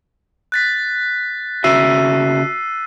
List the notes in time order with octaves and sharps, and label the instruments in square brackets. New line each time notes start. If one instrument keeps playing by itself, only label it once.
[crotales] F#6 A6 B6
[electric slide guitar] C#3 F#4 E5 [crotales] E6 C7 D#7